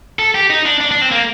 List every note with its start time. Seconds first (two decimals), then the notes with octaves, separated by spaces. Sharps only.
0.19 A4
0.35 G4
0.50 D#4
0.65 D4
0.81 D4
0.91 D4
1.02 C4
1.11 A#3